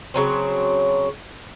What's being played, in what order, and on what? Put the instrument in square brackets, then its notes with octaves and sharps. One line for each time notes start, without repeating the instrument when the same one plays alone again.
[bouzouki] C#3 F#3 C4